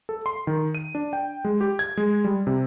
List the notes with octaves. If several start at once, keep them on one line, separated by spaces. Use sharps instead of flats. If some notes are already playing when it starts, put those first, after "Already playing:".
A4
C6
D#3
D#7
D4
G5
G#3
G4
G#6
G#3
G3
C3